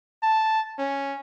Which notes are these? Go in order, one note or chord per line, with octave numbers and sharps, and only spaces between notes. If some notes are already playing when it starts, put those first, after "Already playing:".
A5
C#4